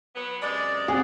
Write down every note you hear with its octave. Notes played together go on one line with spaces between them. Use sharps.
F#3 B3
F#2 C3 G#3 D5
C4 G#4 F#5